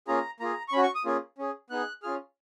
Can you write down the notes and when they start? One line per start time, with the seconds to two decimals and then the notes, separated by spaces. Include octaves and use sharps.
0.08 A#3 C#4 F4 G#4 A#5
0.40 A#3 F4 G#4 A#5
0.68 C#6
0.73 C#4 F#4 B5
0.83 C#6
0.95 D#6
1.05 A#3 C#4 F4 G#4
1.38 C#4 G#4
1.70 B3 D#4 G#4 F#6
2.03 C#4 F4 G#4 F6